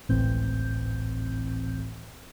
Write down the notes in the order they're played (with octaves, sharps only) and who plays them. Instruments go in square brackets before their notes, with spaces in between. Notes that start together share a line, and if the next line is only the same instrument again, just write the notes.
[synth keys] G#1 C#2 A2 E3 C4 G6